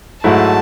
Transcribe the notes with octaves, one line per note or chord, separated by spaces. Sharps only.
G#2 F#3 A3 E4 A5